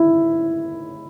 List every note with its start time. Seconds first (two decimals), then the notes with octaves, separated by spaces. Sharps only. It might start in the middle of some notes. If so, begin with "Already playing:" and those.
Already playing: E4